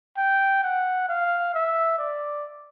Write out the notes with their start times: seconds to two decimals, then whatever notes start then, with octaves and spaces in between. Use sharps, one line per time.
0.17 G5
0.63 F#5
1.08 F5
1.54 E5
1.98 D5